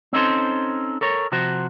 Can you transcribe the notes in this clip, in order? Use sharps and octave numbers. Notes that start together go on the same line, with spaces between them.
C4 C#4 D#4 A4 C5
A4 A#4 C#5
C3 F3 F#4 C5